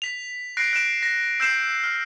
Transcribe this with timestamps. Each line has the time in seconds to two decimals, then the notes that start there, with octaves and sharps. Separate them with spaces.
0.02 B6 F7
0.57 F#6 A#6 C7 D7
0.73 F#6 D7 E7
1.03 A#6
1.40 E6 G6 C7 E7
1.83 F6